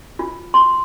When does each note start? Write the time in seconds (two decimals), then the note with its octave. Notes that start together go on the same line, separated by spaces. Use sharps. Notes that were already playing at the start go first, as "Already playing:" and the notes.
0.19 F4
0.54 C6